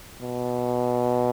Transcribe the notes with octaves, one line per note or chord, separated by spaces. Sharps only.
B2